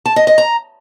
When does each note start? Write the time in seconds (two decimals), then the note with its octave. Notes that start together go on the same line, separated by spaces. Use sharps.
0.06 A5
0.16 D#5
0.27 D#5
0.38 A#5